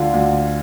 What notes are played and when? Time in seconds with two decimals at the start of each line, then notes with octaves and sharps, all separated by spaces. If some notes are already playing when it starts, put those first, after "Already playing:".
Already playing: D2 D3 F4
0.14 D2